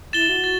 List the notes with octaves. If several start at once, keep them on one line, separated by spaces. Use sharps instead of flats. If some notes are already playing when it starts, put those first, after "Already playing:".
E4 A6 E7 G7
F#4
A6